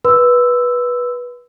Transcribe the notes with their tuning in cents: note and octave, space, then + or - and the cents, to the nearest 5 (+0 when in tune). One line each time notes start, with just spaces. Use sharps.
B4 -15 C6 -45 E6 +0